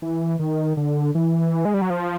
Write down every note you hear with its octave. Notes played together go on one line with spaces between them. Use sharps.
E3
D#3
D3
E3
G#3
G3
F#3
F3